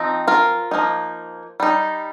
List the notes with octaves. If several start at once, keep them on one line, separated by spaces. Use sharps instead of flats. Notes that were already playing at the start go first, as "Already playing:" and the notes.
Already playing: F3 C4 D#4
F4 A#4
F3 A#3 D#4
G3 D#4